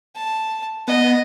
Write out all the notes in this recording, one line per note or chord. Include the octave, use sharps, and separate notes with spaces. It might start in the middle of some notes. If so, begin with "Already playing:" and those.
A5
B3 D#5